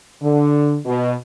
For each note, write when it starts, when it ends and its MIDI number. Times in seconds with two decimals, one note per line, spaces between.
0.22 0.77 50
0.86 1.14 47